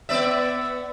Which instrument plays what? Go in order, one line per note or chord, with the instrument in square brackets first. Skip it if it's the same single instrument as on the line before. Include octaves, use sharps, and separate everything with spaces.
[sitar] B3 D5 E5